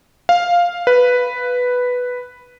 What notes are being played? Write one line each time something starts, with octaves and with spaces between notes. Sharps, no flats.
F5
B4